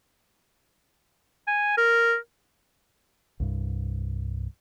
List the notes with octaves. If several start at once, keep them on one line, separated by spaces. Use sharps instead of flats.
G#5
A#4
C2 G2